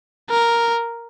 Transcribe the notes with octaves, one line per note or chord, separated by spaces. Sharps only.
A#4